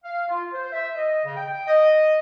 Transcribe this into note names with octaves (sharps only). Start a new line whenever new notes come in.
F5
F4
C5
E5
D#5
C#3
G5
D#5